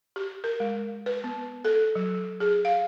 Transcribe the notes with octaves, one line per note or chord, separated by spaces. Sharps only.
G4
A#4
G#3
B4
B3
A4
F#3
G#4
F5